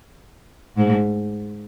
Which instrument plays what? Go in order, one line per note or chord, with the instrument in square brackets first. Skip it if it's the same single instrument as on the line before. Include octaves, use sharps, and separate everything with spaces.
[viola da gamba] G#2